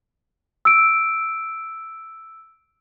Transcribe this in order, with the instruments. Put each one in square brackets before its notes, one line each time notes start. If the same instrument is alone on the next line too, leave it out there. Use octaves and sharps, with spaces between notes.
[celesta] E6 D7